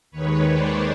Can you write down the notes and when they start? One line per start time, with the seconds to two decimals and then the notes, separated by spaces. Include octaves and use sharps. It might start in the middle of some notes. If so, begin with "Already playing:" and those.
0.11 D#2 D#3 G#3 B4 C#5
0.46 C5 D5